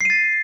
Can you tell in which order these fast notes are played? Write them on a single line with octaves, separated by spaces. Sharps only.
C7 D#7 A6